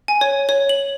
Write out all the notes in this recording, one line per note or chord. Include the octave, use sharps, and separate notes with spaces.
G#5
C#5
C#5
F#7